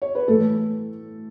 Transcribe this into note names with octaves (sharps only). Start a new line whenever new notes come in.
C#5
B4
A2 E3 A3 A4